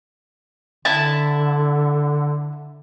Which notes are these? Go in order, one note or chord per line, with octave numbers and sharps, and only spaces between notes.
D3 E4 A5